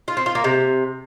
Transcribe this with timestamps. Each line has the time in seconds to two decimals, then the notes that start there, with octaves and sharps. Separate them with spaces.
0.08 F4
0.17 C4
0.26 F4
0.35 A#3
0.44 C3